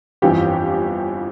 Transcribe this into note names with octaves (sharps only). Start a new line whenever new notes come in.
G1 F2 E3 G4